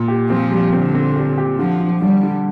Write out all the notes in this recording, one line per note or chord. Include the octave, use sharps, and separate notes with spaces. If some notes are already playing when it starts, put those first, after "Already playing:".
Already playing: A#2
G4
F3 C4
G3
D3 C4
C4
G4
G4
D3 F3
D3
D3 G3
D3